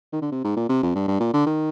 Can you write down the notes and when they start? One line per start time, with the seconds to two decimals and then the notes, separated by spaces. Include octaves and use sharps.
0.13 D#3
0.22 D3
0.32 C3
0.44 G#2
0.57 A#2
0.69 C3
0.83 F2
0.95 G2
1.07 G2
1.20 A#2
1.33 D3
1.46 D#3